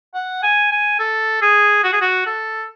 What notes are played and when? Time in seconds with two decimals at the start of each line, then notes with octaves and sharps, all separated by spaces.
0.14 F#5
0.42 G#5
0.71 G#5
0.99 A4
1.42 G#4
1.84 F#4
1.92 G#4
2.01 F#4
2.26 A4